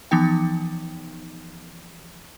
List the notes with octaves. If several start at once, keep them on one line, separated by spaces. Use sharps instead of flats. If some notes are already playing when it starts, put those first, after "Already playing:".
E3 F3 B3 D#4 G5